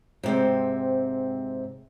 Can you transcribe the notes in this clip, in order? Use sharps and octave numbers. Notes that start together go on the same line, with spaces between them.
G#2 C3 C4